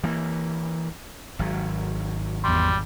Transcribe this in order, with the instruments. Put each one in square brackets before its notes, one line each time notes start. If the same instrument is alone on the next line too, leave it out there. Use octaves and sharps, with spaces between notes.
[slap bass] E3 A#3
G#1 F#3
[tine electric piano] E2 C6 [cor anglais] G3